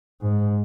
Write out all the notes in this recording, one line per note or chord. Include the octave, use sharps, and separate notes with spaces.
G#2